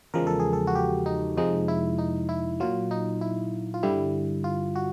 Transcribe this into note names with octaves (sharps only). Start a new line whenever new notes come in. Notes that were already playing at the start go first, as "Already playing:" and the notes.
E2 C#3 F3 G#3 A#4
A4
G#4
A4
F#4
G4
D#4
F2 C3 F3 G#3 D#4
E4
D#4
E4
A#2 F#3 F4
D#4
E4
F4
G2 D3 G3 E4
F4
F#4